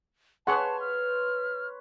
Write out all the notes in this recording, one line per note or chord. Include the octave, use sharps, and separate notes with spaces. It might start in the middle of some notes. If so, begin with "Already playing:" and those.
G#4 B4 C#5 F#5 A5 C6
F6